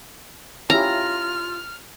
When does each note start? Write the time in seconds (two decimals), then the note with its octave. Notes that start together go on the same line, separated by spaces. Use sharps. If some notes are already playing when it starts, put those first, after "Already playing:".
0.70 C#4 E4 F4 G4 A#5 F6